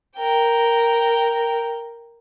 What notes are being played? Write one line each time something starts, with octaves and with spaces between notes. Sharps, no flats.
A#4 G5